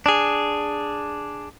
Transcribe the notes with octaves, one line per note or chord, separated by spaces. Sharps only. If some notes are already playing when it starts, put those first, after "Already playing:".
D4 G#4